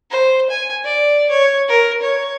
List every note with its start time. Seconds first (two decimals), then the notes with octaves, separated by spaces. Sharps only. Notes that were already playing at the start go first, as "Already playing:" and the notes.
0.10 C5
0.50 G#5
0.84 D5
1.30 C#5
1.68 A#4
2.02 C#5